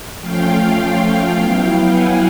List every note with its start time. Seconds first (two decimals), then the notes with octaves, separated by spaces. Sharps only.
0.21 F3 A3 C#4 F4 F5 G5
1.33 F#3 B3 E4 F5 G5
1.88 F#5 G#5